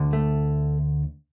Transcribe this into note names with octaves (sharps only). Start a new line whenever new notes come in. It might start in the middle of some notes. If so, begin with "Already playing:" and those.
Already playing: D2 D3
A3